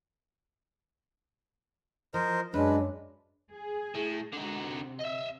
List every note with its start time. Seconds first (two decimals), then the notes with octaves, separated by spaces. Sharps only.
2.14 F3 A#4 C5 D#5
2.54 F#2 F#3 G#3 D4 B4
3.51 G#4
3.95 A2
4.33 D3 G#3 D#4 F#4
4.63 C3
4.99 D#5 E5